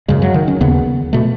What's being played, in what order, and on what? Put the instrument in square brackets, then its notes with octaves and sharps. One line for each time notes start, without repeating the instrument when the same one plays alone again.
[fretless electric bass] F#2 C#3 G#3
F#3
D#3
C#4
D#2 C#3 B3
B2 A3